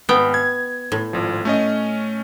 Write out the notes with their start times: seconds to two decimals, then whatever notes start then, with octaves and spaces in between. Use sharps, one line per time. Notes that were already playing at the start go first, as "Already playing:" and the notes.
0.09 G#1 B3 G5
0.34 G#6
0.92 A2
1.13 G#1 F3
1.45 A3 C#4 D#5